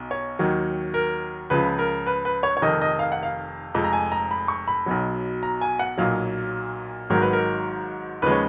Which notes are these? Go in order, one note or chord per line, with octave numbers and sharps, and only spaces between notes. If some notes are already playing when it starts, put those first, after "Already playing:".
Already playing: B1 B2
C#5
D#2 D#3 F#3
A#4
C#2 C#3 F3 B4
A#4
B4
B4
C#5
C#5
F1 F2 D#3 D#5
D#5
F5
F#5
F5
F1 F2 F3 G#3
A#5
G#5
A#5
B5
C#6
B5
B1 B2 F#3
A#5
G#5
F#5
B1 A#2 F#3 F5
G#1 G#2 D#3 F#3 A#4
B4
A#4
D#2 C#3 F3 G#3 B4
C#5